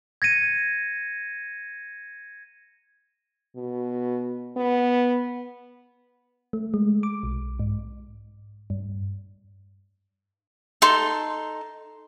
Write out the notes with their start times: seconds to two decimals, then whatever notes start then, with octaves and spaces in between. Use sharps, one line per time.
0.22 G#6 A#6 C#7 D#7
3.57 B2
4.57 B3
6.53 A3
6.74 G#3
7.03 D6
7.23 B1
7.59 G#2
8.70 G2
10.82 D#4 A4 C6